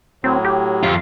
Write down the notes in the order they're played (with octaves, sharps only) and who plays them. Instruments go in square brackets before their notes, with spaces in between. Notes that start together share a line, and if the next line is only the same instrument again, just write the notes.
[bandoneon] A2 F#3 [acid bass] C4
[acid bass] G4
[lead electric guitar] F2 F4